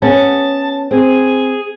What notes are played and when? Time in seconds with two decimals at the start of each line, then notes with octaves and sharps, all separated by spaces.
0.02 B3 C#4 G#4 A5
0.91 C4 G#4